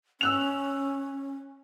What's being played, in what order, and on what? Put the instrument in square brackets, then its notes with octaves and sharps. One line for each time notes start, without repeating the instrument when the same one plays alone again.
[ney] C#4 [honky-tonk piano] E6 F#6 F7